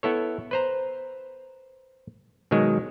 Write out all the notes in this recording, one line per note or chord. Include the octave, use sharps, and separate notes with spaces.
B3 E4 A4 C#5
B4 C5 A#5
B2 D#3 F#3 G#3